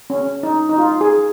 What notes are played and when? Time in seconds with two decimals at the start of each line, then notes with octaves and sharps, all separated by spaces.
0.10 C#4
0.43 D#4
0.69 D#4
0.78 F4
1.01 G#4